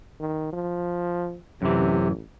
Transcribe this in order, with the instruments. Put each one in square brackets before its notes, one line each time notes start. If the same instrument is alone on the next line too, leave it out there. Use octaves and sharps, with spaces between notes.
[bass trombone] D#3
F3
[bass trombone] A1 [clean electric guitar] F#2 E3 [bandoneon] C3